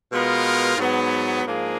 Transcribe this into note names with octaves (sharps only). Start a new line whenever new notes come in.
B2 G#3 B3 F4 A#4
G#2 F#3 B3
G#2 F3 A#3 D4 G#4